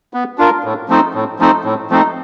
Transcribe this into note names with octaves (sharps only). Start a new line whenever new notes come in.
B3
D4 F4 A#4
A2
F3 A3 C4 D#4
A2
F3 A3 C4 D#4
A2
F3 A3 C4 D#4